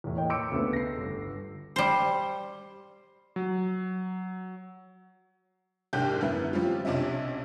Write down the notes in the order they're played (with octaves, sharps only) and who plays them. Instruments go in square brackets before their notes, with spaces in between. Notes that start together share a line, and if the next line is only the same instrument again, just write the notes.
[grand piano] E2 A2
A#3 C#5 D#5 G5
C6 D6 E6 G6 C#7 D7
D2 C#3 A3 B3
A#6 C7
G1
[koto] G3 C5
[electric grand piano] F#3
[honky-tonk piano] C2 G#2 D4 G4 F#6 G6
F#2 D3 G3 B3 E4
F3 G3 C4 C#4 F4
B1 C3 C#4 D4 D#5 E5